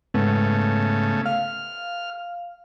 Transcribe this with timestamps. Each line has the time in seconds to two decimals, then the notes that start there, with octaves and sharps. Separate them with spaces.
0.14 G#2 C#3 A3 B3
1.25 F5 F6